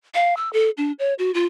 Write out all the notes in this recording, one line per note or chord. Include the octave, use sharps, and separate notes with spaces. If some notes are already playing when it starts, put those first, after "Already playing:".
F5
E6
A4
D4
C#5
F#4
F4